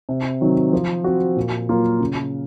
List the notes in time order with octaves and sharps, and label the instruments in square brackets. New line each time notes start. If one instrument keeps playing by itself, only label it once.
[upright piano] C3
D#3 F#3 C4
F3
C4 F#4
A#2
F#3 A#3 F4
C#3